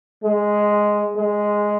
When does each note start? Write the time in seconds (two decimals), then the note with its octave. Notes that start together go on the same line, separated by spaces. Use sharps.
0.24 G#3
1.16 G#3